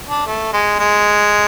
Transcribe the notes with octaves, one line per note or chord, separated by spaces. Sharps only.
D4
A3
G#3
G#3